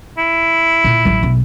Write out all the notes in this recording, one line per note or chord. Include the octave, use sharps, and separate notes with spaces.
E4
A#2
A1 F#3
B1